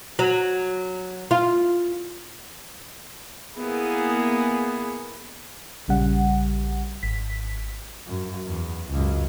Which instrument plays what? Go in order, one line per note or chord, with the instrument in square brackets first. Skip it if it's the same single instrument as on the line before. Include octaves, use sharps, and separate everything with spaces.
[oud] F#3
F4
[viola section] A#3 B3 E4 G#4
[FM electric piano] A#1 C#3 G3 F#5
G#1 B6
[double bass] F#2
E2
C#2 F#2